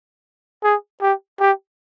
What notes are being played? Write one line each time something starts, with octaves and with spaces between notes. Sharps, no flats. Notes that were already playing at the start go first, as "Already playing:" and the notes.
G#4
G4
G4